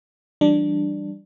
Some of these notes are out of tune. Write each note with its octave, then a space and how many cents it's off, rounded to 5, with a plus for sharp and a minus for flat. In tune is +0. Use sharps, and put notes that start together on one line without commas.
E3 +35 G3 +0 D4 +10